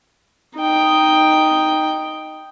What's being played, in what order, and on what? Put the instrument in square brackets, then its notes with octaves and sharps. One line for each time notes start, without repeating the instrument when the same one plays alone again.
[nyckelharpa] D#4 G5